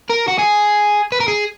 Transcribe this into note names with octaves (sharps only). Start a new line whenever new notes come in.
A#4
F#4
G#4
B4
A#4
G#4